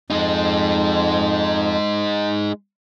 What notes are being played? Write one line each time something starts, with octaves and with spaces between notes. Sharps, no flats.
F2 G#3 D#4